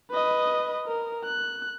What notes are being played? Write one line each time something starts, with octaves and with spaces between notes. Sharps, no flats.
B4 D#5
A#4
F#6